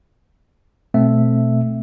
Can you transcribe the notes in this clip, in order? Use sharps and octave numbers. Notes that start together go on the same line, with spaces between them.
B2 A3 C4 E5